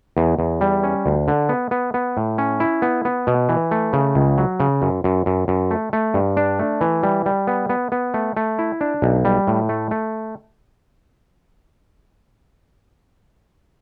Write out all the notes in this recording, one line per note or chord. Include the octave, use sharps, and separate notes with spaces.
E2
E2
G3
C#4
D2
D3
B3
B3
B3
A2
C#4
E4
B3
B3
B2
E3
A3
C#3
C#2
F#3
C#3
F#2
F#2
F#2
F#2
A3
A3
G2
D4
A3
E3
G3
G3
B3
B3
B3
A3
A3
E4
D4
B1
G3
A2
A3
A3